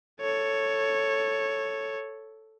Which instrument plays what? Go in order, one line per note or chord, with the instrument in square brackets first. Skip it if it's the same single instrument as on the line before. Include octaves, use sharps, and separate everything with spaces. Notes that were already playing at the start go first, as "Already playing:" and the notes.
[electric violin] A4 C#5